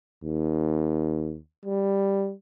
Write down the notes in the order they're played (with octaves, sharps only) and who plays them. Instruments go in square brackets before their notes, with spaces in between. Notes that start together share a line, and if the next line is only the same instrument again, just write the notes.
[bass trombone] D#2
G3